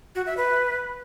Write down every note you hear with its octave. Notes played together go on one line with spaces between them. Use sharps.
F#4
E5
B4